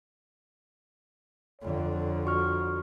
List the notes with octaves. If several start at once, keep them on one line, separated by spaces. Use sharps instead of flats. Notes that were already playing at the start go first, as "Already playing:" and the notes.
F2 D3 C#5
F#4 C#6 F6